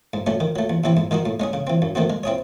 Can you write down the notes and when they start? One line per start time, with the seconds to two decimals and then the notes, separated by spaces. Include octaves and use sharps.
0.13 G#2
0.27 F#3 A3 C#4
0.40 D#3
0.56 F#3 A3
0.70 E2
0.84 C3 E3 C4 E4
0.97 G#2
1.11 D#3 G#3 D#4 F#4
1.25 A2
1.40 G#3 C#4 G#4
1.53 C#3
1.67 E3 C4
1.82 F#2
1.95 D#3 A3 C4 F#4
2.10 G#3
2.23 C4 E4 G#4 C#5